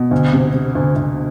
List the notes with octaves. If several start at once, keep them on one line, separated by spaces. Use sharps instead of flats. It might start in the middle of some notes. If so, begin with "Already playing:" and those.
Already playing: B2
D2
C3
C3
D2
D2